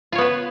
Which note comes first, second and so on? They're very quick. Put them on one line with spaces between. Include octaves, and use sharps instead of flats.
F4 C#5 B3 B4